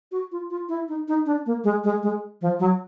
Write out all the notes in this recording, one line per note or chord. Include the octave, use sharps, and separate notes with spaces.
F#4
F4
F4
E4
D#4
D#4
D4
A#3
G#3
G#3
G#3
F3
F#3